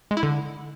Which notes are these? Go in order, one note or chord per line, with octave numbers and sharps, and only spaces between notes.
G#3
E4
D3